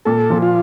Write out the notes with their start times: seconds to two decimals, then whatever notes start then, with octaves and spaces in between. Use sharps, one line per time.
0.05 A#2 A4
0.30 F3
0.42 F4